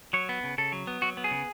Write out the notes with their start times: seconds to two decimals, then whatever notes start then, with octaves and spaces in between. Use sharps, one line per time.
0.13 F#3 C#5
0.29 B3
0.44 C#3
0.58 C#3 A4
0.72 F#3
0.87 B3
1.02 F#3 F#4
1.17 B3
1.24 G#4
1.31 C#3